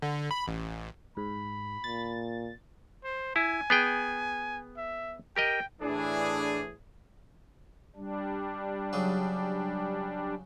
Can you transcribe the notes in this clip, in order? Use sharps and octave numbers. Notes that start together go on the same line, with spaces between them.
D3
B5
A1
G#2 B5
A#2 A6
C5
E4 G#5
B3 G#4 G5
E5
G4 A#4 D#5 G5
A2 E3 D4 G#4
G3 D4
C#3 F#3 G#4